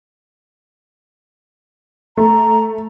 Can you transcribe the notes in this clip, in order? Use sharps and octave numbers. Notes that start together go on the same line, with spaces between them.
A3 A#5